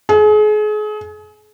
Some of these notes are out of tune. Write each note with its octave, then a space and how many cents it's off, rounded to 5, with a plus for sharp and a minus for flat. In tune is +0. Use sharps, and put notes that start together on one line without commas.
G#4 +35